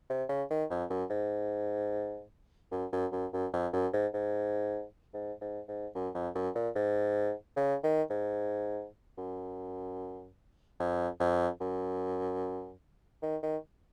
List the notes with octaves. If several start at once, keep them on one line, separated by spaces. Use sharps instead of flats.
C3
C#3
D#3
F2
F#2
G#2
F#2
F#2
F#2
F#2
F2
F#2
G#2
G#2
G#2
G#2
G#2
F#2
F2
F#2
A#2
G#2
C#3
D#3
G#2
F#2
F2
F2
F#2
D#3
D#3